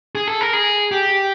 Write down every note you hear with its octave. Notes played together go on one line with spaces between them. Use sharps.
G#4
A4
A#4
G#4
G4